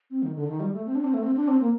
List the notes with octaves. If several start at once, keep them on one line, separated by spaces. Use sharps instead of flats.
C4
D#3
D3
D#3
G3
A3
C4
D4
C4
A3
C4
D4
C4
A#3